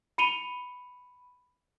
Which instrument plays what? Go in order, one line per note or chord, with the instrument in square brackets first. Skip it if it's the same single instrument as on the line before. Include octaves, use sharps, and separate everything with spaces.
[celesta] B5 C#7 D#7 F7 G7